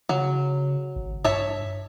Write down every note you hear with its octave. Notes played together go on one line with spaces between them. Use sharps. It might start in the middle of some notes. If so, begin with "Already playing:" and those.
C#3 F#3
G#1
G2 C#5 E5 A5